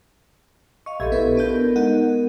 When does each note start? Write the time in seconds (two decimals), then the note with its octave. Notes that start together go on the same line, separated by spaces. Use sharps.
0.86 D#5 F5 C#6
1.00 A#1 G4 A4 D#5 E5 G#6
1.12 B3 E4 B4
1.37 B3 D4 A4 A#4 G6
1.76 G#3 D#4 F#5